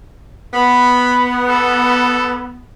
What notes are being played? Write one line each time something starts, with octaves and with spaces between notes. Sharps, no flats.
B3 B5
A4